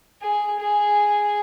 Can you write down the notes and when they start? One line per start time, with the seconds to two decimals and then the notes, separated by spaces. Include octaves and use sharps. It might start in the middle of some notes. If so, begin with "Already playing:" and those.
0.22 G#4
0.60 G#4